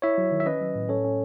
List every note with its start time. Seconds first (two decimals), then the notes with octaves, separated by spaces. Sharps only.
0.02 E4 C#5 E5
0.18 F#3
0.31 D#3
0.40 E5
0.46 C#4 B4 D#5
0.61 F#3
0.75 A2
0.89 C#4 A4 C#5
1.04 C#4